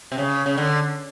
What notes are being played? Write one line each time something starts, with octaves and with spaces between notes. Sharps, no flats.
C3
C#3
C#3
D3